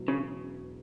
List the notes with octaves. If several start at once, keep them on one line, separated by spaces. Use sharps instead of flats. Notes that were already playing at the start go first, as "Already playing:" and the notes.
Already playing: E1 E2 F#3
C#3